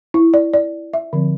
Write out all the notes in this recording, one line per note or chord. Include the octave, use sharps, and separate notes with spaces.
E4
D5
D5
E5
D3 F3 C4